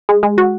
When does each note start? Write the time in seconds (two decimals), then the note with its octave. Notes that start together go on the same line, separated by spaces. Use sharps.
0.09 G#3
0.23 G#3
0.38 F#4